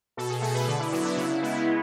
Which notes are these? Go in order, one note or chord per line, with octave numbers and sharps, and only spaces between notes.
B2 A4
G#4
A3 A4
B4
D3 D5
E4
F#3 B3 E4
D4
C#3 E4
G#3 B3